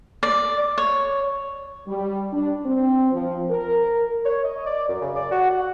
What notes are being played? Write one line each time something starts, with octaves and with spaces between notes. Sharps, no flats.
D5
C#5
G3
D4
C4
F3
A#4
C#5
D#5
D5
F#2
C#3
D5
F#4
F#5